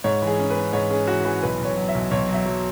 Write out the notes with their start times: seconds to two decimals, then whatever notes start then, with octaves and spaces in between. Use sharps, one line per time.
0.04 G#2 C#5
0.22 E3
0.27 G#4
0.39 C#4
0.50 B4
0.56 C#4
0.73 G#2 C#5
0.90 C#4 G#4
1.07 E3 F#4
1.25 E3 G#4
1.42 B1 B4
1.59 B1
1.65 C#5
1.77 F#3
1.89 E5
1.94 B1
2.11 B1 C#5
2.28 F#3
2.34 E5
2.45 F#3